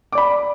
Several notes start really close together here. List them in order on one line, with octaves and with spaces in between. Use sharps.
D6 D5 B5